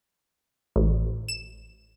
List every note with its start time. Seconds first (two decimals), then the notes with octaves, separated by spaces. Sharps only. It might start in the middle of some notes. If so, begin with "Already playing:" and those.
0.76 A1
1.28 E7